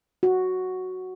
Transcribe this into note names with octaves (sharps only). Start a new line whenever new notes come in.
F#4